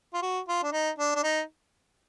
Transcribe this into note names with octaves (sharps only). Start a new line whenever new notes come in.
F4
F#4
F4
D4
D#4
D4
D4
D#4